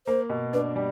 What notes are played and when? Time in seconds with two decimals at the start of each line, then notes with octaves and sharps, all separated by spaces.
0.07 A#3 C5
0.30 B2
0.53 D4 B4
0.76 G3